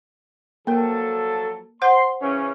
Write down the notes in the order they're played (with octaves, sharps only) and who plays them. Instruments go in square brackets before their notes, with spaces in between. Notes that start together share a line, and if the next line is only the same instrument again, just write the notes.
[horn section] F3 F#3 A4 [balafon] A#3 A#4
[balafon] C5 F#5 [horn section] C6
[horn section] C#3 E3 C#4